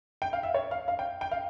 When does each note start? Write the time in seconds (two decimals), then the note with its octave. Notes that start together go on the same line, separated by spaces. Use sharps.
0.22 G5
0.33 F5
0.43 E5
0.54 C#5
0.71 F5
0.88 F5
0.99 G5
1.21 G5
1.31 F5